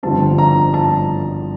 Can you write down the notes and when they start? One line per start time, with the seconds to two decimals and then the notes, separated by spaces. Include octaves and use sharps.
0.03 G1 F2 D3 G3 C4 A5
0.38 A#5
0.74 A5